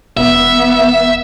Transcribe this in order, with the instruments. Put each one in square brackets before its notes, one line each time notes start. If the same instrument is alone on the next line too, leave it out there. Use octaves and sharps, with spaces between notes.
[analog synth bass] E1 [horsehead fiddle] B3 [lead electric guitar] E5